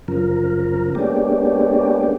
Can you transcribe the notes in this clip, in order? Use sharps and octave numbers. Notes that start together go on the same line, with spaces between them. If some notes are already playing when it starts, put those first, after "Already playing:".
F#2 C#3 F3 A#4
G#3 A#3 B3 C#4 D4 G4